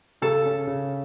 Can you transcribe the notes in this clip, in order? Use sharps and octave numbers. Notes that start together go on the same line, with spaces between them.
C#3 A4
C#4
C#3